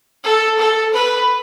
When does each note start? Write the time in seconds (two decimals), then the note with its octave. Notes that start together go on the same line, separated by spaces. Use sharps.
0.24 A4
0.59 A4
0.94 B4